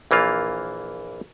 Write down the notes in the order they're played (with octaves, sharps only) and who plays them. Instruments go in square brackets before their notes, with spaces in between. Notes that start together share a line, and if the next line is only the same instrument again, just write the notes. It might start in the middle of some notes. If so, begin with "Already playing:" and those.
[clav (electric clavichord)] A#1 E3 A#3 F4